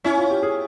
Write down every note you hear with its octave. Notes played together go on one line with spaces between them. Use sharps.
C#4 E4
F4
G4
G#4